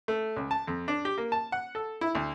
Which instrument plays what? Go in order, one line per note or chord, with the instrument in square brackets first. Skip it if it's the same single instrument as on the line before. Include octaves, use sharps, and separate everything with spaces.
[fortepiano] A3
C#2
A5
F2
D4
G4
A#3
A5
F#5
A4
E4
D2